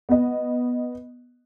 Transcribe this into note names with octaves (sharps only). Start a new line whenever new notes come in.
B3 D#5